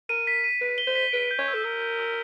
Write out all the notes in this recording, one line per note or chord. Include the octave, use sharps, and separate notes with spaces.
A#4 D#7
B6
D#7
B4 B6
G7
C5
B6
B4 D7
G6
C#5
E6
A4
A#4 G6
G6
E6